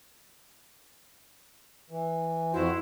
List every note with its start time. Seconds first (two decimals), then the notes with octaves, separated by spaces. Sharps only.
1.90 E3
2.54 F2 E4 F#4 C5